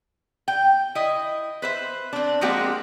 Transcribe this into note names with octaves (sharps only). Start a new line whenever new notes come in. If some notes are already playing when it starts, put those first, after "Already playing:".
G5
E4 D#5
B4 C5 E5
C4 D4
F3 G#3 A#3 C4 F#4 G4